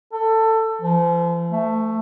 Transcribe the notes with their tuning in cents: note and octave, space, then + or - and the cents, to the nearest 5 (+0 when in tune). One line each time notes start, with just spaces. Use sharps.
A4 +20
F3 -35
A3 +10